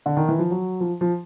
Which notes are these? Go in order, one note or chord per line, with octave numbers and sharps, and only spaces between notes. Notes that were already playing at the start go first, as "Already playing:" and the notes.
D3
D#3
E3
F3
F#3
F3
F3